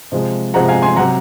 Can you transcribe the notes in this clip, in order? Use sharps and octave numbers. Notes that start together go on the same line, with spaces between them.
C3 F3 G#3
C3 F3 G#3 F#5 A#5
F5 G#5
G#5 C6
C3 F#3 F#5 A#5